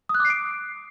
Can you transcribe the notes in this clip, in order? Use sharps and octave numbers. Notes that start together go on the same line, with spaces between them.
D#6
F#6
D6
C7
D7